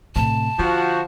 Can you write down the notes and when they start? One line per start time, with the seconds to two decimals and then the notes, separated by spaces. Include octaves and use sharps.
0.16 A2 C3 A5
0.59 D3 F3 F#4